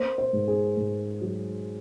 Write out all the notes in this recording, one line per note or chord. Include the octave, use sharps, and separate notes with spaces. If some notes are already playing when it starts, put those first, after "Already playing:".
Already playing: A#3 C5
C5
G#2
G#4
G#2
F#3